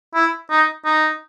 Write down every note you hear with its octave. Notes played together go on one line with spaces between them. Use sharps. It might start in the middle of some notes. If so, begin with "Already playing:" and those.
E4
D#4
D#4